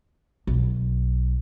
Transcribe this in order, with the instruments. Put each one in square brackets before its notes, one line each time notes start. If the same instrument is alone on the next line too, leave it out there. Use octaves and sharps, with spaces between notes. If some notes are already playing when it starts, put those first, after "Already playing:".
[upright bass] B1